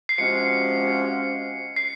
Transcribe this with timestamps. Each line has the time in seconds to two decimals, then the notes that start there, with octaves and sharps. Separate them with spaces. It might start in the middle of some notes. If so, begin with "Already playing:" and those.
0.09 C7
0.18 C3 F3 G#3 C#4 F#4 C#7
1.76 C7